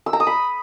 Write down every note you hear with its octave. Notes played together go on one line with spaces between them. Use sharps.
E6
A#5
D#6
B5